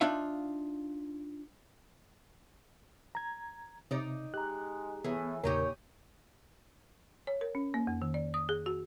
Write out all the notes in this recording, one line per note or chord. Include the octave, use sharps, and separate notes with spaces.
D4 D#4 F4 E5 F5
A#5 G#6
C3 D#4 D5
G#3 G4 A#5 F#6
A2 E3 B3 G#4
E2 A#2 C#3 D#4 G4 A#4 C#5
C#5
A#4
C#4
A#3
F2
D#3
D5
D#6
G#4
F#4